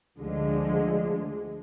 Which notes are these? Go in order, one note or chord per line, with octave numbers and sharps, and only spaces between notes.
D2 D3 F3 G#3